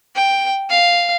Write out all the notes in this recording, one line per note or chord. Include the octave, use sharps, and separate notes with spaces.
G5
F5